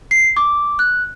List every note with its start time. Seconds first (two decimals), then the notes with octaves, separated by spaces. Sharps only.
0.11 C7
0.37 D6
0.79 F#6